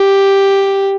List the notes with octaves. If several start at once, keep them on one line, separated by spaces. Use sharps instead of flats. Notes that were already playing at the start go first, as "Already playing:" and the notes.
Already playing: G4